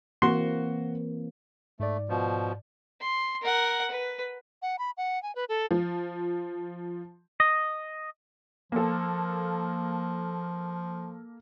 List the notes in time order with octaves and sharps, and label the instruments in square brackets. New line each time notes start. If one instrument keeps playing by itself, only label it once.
[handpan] E3 A#3 C4 [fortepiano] F#4 C6
[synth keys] G#2 D5 [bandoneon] A3
[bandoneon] B2 F3
[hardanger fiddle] C6
A#4 F#5
B4
[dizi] F#5
B5
F#5
G#5
B4
A4
[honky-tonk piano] F3
[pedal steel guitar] D#5
[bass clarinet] F3 [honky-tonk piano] A#3 A4